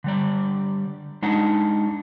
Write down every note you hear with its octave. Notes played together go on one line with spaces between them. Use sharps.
D3 G3 D5
G#3 D4 D#4 F#5